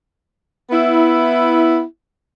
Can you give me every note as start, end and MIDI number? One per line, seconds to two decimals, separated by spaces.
0.71 1.82 59
0.71 1.82 64